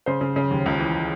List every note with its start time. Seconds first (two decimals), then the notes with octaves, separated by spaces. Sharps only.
0.06 C#3 C5
0.21 C#3
0.36 C#3
0.51 D#2
0.66 C#2
0.80 E3